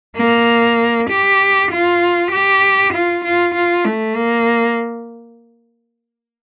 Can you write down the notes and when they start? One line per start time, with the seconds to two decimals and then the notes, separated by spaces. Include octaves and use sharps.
0.17 A#3
1.10 G4
1.71 F4
2.32 G4
2.94 F4
3.25 F4
3.55 F4
3.85 A3
4.16 A#3